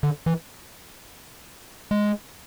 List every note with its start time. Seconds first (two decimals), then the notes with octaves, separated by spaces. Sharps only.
0.03 D3
0.26 E3
1.91 G#3